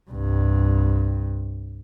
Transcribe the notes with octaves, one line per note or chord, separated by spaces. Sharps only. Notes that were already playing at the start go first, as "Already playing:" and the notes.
C2 G2